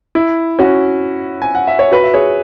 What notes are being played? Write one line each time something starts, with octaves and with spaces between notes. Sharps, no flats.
E4
C#4 F#4
G#5
F#5
E5
C#5
F#4 B4
E5
G#4 C#5